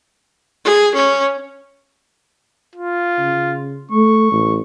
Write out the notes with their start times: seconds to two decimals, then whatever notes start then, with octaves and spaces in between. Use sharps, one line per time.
0.65 G#4
0.95 C#4
2.76 F4
3.19 C#3
3.92 A3 C#6
4.31 A1